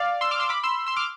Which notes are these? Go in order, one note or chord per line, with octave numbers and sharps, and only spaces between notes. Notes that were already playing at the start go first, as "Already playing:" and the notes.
Already playing: D5 F5
C6 E6
D6 F6
C6 E6
B5 D6
C6 E6
C6 E6
D6 F6